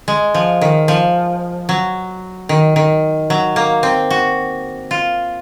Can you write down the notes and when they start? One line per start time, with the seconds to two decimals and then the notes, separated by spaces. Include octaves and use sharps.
0.08 G#3
0.34 F3
0.61 D#3
0.88 F3
1.69 F#3
2.49 D#3
2.76 D#3
3.30 F#3
3.56 A#3
3.83 C4
4.10 F#4
4.91 F4